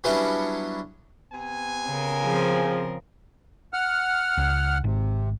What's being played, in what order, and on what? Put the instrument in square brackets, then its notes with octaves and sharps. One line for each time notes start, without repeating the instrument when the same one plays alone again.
[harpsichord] F#3 G3 B3 C#4 D4 E4
[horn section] C3 B3 G#5
[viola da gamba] C#3 A#4
[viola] F3 C4 [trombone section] G#4
[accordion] F#5 F6
[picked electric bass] C#2
[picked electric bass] G#1 [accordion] C3